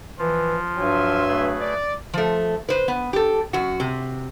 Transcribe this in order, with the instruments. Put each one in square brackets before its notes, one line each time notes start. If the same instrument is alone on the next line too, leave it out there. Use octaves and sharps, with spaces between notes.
[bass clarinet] E3 [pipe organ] F3 F4
[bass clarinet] G2 [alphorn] F#3 [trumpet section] E5 G#5 C6
[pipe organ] A3 G#4 B4
[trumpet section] D5
[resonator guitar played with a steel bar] F3 A3
B4 C5
B3
G4 A4
F#2 F#4
C3